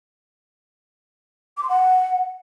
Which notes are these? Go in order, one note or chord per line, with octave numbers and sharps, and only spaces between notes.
D6
C6
F#5